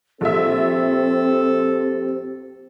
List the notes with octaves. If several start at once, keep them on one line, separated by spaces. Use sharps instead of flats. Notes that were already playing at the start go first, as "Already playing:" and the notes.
A#1 C4 G4 A4 E5